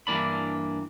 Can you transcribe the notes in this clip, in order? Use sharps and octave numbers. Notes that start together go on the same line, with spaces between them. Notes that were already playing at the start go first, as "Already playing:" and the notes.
G2 E3 A#3 D4 B5